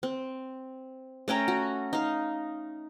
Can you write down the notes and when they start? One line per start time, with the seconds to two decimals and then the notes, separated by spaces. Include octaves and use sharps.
0.03 C4
1.28 A3 C#4 G5 A#5
1.48 F#4
1.93 D#4 F5